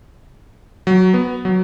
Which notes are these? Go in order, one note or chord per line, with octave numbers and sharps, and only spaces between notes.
F#3
B3
F#3